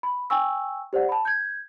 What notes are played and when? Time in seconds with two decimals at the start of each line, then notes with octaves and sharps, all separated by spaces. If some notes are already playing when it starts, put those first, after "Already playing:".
0.03 B5
0.30 G5 G#5 C#6 E6
0.93 G4 C5 D5 F#5
1.09 A5 B5
1.25 G6 G#6